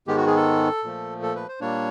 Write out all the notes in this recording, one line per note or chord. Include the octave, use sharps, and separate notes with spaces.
G#2 D#3 G#3 B3 G4
F#4
G#4
A4
A#2 F3 A3
A4
B4
C5
A#2 G3 A#3 D4 C#5